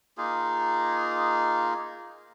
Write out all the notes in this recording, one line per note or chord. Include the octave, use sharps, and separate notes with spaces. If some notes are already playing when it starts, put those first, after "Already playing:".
A#3 D#4 F4 G#4